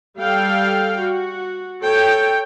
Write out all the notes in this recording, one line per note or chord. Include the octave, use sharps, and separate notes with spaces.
G3 A4 F5 G5
F#4
A4 C#5 G5